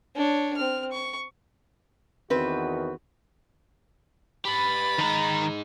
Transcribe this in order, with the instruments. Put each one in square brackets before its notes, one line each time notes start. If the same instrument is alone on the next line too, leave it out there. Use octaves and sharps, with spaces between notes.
[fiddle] D4 C#5
C4 F6
C#6
[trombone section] E2 D#3 F#4 [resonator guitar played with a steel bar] C4 B4
[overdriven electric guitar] G4 B4 [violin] B5 A6
[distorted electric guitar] D#3 A#5 [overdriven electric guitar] G#3 D#4